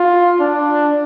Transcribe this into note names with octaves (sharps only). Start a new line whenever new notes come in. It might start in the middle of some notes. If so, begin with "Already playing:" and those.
Already playing: F4
D4